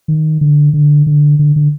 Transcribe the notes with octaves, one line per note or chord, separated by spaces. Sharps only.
D#3
D3
D3
D3
D3
D3